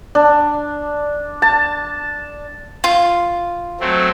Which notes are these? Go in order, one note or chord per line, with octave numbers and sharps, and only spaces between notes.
D4
A5
F4
F#3 A3 C4